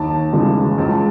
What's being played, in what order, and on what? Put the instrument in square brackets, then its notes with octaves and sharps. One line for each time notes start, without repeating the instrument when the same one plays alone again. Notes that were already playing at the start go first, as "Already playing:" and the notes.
Already playing: [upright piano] D#2 A5
C#3 E3 G#3
C#2 A5